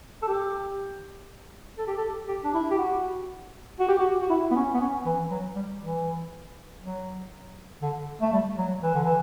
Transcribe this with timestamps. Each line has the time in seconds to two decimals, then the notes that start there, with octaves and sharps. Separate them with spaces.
0.22 A4
0.27 G4
1.78 A4
1.87 G4
1.97 A4
2.28 G4
2.44 D4
2.54 E4
2.71 G4
2.78 F#4
3.80 F#4
3.89 G4
3.98 F#4
4.22 F#4
4.30 E4
4.51 B3
4.56 C#4
4.74 B3
4.80 C#4
5.06 E3
5.31 F#3
5.56 G3
5.81 E3
6.82 F#3
7.82 D3
8.22 A3
8.32 G3
8.58 F#3
8.83 E3
8.94 D3
9.05 E3